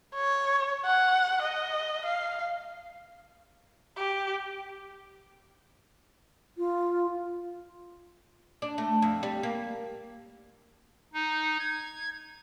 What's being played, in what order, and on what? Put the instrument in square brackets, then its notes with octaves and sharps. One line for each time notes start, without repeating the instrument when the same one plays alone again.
[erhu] C#5
F#5
D#5
F5
G4
[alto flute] F4
[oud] D4
A3
F2
G3
A#3
[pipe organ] D#4
G#6